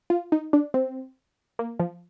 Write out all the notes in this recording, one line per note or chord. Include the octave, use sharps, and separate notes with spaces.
F4
D#4
D4
C4
A#3
F3